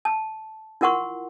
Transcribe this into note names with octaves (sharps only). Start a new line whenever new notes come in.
A5
E4 F4 A#4 F#5 C6 C#6